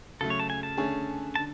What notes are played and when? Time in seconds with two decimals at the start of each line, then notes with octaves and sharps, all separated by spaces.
0.21 C#3 F#3 A3 A4
0.30 C#5
0.40 A5
0.50 G#5
0.63 A5
0.77 D3 A3 C#4 G#4 C#5
1.36 D3 A5